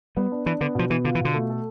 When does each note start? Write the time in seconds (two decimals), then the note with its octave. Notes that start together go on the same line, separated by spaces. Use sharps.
0.16 G3 B3
0.32 D4
0.46 E3 D4
0.61 D3 B3
0.75 B2 F3
0.90 E3 B3
1.05 D3 F4
1.15 E3
1.20 B2 D3
1.34 A3
1.50 A4